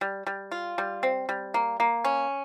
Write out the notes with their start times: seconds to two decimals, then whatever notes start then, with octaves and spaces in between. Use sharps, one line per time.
0.01 G3
0.27 G3
0.52 F4
0.78 G3
1.03 C4
1.29 G3
1.54 A#3
1.80 A#3
2.04 C#4